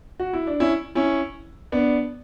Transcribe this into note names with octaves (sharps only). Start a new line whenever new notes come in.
F#4
E4
D4
C#4 E4
C#4 E4
B3 D4